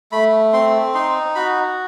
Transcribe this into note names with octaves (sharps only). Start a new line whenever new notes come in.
A3 B5
C4 C6
D#4 C6
F#4 B5